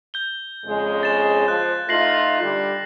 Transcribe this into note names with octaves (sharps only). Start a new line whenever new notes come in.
G6 G7
F2 C#3 G#3
A6 E7
F3 F#6
A3 D#4 F4 A#6 C7 F#7
D3 G3